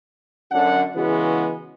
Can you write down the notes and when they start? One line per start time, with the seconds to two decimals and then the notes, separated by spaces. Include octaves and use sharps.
0.52 F#2 D3 D4 F#5
0.95 C#3 E3 G#3 B3 F#4